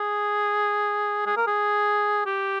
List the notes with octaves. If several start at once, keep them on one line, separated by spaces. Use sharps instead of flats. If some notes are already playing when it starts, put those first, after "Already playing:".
Already playing: G#4
G#4
A#4
G#4
G4